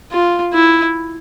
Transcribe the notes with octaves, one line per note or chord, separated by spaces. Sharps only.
F4
E4